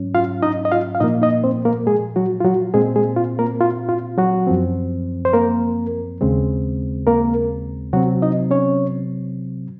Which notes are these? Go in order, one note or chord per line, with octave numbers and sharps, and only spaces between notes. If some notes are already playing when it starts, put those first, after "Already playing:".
Already playing: G#2 F#3 C#4
F4 F5
D#4 D#5
D#5
F4 F5
F5
A#2 F3 A#3 D#4 D#5
D#4 D#5
C4 C5
A#3 A#4
G#3 G#4
F#3 F#4
F4
F#3 F#4
A#2 G#3 C4 G#4
G#3 G#4
F4
A#3 A#4
F4
F4
F#3 F#4
F#2 F3 C4
C5
A#3 A#4
D#2 C#3 G#3 C4
A#3 A#4
C3 F#3 C4 F#4
D#4 D#5
C#4 C#5